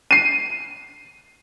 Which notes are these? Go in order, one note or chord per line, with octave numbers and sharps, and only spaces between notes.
C7 D#7